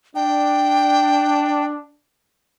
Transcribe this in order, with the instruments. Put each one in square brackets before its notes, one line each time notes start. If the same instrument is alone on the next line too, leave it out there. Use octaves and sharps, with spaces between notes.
[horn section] D4 [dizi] G5